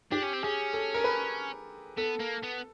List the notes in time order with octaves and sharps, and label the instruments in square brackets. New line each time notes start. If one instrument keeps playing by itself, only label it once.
[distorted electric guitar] D4 [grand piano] G4
[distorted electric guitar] C#4
C4
[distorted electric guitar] C#4 [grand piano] G#4
[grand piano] A4
A#4
B4
[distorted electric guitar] B3 [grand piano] A4
[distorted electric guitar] A#3
B3